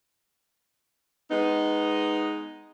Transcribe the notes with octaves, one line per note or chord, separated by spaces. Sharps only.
G#3 B3 D#4